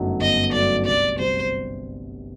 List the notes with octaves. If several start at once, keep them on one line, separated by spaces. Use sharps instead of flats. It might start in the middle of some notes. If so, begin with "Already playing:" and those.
Already playing: G1 F#2 F#3 A3 D#4
G1 D#5
F#2 F#3 A3 D#4 D5
C2 D5
C3 G3 C4 C5